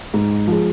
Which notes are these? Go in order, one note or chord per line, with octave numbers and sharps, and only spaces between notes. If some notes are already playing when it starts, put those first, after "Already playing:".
G#2
F3 G#3